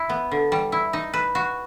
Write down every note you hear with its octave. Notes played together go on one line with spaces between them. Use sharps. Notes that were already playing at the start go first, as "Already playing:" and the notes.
Already playing: E4
B3
D3
G3
E4
D#4
B4
F#4